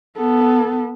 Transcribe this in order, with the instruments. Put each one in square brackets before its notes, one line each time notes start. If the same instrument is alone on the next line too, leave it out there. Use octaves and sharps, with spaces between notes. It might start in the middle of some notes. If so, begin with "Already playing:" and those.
[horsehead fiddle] B3 [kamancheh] A4